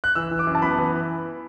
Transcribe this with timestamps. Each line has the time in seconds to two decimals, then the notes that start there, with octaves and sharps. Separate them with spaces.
0.04 F#6
0.15 E3 E6
0.31 E3
0.39 D6
0.47 F#2
0.55 A5
0.62 B3 B5
0.79 E3